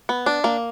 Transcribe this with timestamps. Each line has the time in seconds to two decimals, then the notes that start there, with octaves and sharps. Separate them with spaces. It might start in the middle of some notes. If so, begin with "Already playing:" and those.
0.09 B3
0.26 D4
0.44 A#3